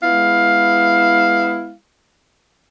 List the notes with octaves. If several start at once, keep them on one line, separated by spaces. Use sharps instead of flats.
G#3 B3 E4 F5